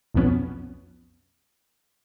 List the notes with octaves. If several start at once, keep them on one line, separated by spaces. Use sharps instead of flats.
B1 F2 F3 B3 C#4